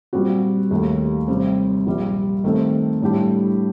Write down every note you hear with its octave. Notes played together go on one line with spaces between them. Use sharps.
A#2 G3 C4 F#4
D#2 D#3 A3 D#4 G4
C3 G3 C4
A#1 A#2 G3
D#3 A3 C4
A2 G3 D4 G4